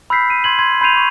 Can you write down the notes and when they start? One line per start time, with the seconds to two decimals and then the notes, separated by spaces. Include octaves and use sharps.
0.10 B5 E6 F6 G6 B6 C7
0.30 D#7
0.44 C6 G#6 F#7
0.59 C6 G#6
0.81 B5 C6 G6 C7 D#7 F7
0.93 C6 C#6